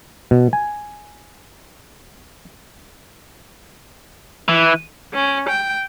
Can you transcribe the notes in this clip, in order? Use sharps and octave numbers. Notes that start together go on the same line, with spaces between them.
B2
G#5
E3
C#4
G5